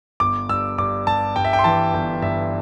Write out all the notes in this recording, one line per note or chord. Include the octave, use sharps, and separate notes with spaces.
G1 D6
G2 E6
G2 D6
G2 A5
G2 G5
E5
G5
C6
E3 A5
G1 G5
G2 E5